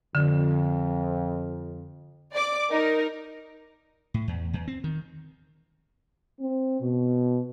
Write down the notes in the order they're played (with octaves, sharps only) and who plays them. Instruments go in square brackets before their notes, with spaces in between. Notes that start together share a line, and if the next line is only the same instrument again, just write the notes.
[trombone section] F2 [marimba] D3
[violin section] D5 D6
D#4 A#4
[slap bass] A2
E2
E2
C4
D#3
[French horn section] C4
B2